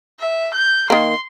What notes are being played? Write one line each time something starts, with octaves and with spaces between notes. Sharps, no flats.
E5
G6
D#3 A#3 C6